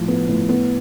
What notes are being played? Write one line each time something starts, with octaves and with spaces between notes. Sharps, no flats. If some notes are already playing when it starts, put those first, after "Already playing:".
Already playing: A2 F3
B3
A2
B3